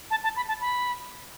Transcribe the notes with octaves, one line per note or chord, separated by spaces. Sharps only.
A5
A5
B5
A5
B5